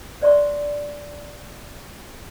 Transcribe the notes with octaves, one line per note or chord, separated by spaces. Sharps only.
C5 D5 E5 C6 C#6